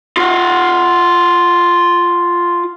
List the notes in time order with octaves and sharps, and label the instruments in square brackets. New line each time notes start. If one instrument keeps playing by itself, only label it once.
[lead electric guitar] F4 F#5